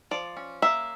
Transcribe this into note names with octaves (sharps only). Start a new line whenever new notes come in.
F3 D5
C#4
A#3 E5